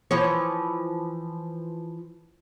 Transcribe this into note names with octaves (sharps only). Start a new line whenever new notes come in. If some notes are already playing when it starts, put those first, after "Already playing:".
E3 F3 C#5